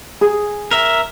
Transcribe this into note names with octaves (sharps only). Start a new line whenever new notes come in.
G#4
A#4 E5